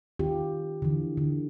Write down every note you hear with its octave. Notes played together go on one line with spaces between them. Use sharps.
D#3 C4 F4 G4
D3 E3
D3